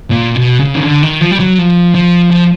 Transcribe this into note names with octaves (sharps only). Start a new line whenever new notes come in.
A#2
B2
C#3
D#3
D3
D#3
F3
G3
F#3
F3
F3
F3